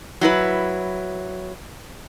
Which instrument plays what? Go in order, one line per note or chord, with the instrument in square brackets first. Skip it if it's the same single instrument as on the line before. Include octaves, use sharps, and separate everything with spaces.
[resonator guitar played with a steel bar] F#3 E4 B4